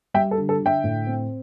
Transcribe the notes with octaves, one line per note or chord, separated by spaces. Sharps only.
G3 E5 G5
A4
D3
A4
D3
E5 G5
A2
C4